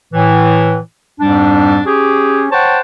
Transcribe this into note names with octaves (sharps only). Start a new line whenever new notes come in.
A2 E3
F2 G#2 G3 D4
C#4 G4 G#4
C5 C#5 F#5 G5 A5